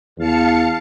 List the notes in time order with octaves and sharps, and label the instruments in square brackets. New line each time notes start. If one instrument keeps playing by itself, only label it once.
[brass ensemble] E2 [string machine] F5 A5 C#7